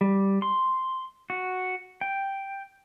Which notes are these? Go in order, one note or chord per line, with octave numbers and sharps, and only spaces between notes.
G3
C6
F#4
G5